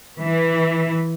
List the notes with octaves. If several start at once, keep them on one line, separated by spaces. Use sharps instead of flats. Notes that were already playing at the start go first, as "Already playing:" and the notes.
E3